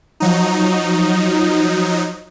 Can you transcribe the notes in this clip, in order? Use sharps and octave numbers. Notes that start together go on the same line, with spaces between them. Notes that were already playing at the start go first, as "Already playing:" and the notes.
F3 F#3 D#4